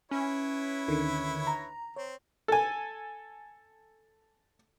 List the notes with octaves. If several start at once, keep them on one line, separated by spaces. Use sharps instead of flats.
C#4 E4 B4 C#5
D2 D3 D#3
A#5
C4 C#5
A4 G#5